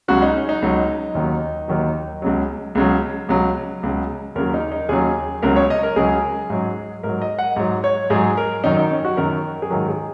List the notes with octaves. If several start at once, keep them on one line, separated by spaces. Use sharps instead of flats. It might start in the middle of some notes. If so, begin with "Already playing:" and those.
C#2 C#3 F#3 F#4
D#4
C#4
D#4
C#2 C#3 F#3
D#2 D#3 F#3
D#2 D#3 F#3
C#2 C#3 F#3
C#2 C#3 F#3
C#2 C#3 F#3
C#2 C#3 F#3
D#2 C#3 F#3 A#4
D#4
D#4
D#2 C#3 F#3 G#4
C#2 C#3 F#3 A#4
C#5
D#5
A#4
C#2 C#3 F#3 G#4
G#2 F#3
G#2 F#3 A#4
D#5
F#5
G#2 F#3
C#5
G#2 F#3 G#4
A#4
F#2 D#3 F#3 D#4
D#4
C#4
F#4
F#2 D#3 F#3 A#4
G#4
G#2 D#3 F#3 A#4
G#4